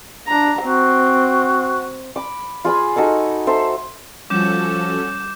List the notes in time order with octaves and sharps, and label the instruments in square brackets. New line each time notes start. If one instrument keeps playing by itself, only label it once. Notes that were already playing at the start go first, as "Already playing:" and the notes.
[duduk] D4 [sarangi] A#5
[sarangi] C4 [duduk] F#4
[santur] B5 D6
F4 G#4 G#5 B5
D#4 F#4 A4 G#5
A4 C5 E5
[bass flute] F3 [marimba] G3 [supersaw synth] C#4 F#4 A4 [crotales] D6 G6 E7